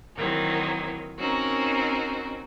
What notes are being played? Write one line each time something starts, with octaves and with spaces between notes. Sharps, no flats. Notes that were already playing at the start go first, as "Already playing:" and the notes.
D#3 E3 F#3 A#3 C4
C4 C#4 D#4 F#4 A#4